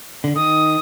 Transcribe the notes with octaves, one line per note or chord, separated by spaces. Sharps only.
D3
D#3 D#6